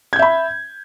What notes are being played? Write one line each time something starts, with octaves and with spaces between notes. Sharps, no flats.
E5 B5 G6 G#6